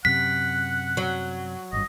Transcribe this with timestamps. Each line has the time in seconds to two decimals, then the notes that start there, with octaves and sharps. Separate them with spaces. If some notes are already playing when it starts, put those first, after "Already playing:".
0.05 F#2 C3 F#5 B6
0.97 F#3
1.73 G#1 G2 D#5